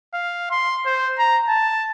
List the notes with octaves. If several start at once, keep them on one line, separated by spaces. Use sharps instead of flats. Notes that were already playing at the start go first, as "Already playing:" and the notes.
F5
C6
C5
A#5
A5